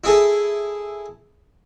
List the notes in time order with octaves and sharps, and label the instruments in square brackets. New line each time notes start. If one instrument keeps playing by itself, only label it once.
[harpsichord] E4 G#4 A4